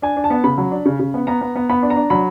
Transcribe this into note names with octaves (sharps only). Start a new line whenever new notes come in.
D4 G#5
D4
A5
B3
C#3 B5
F#3
D4
C#3
C#3
B3
B3 A#5
B3
B3
B3 B5
D4
A#5
D4
F#3 B5